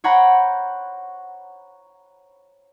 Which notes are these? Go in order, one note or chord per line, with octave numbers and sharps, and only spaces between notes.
C5 C#5 F#5 G5 A#5 B5